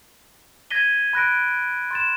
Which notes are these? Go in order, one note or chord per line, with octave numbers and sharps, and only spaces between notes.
G#6 A#6 B6 D#7 G7
B5 F#6 A#6 D7
C6 A6 E7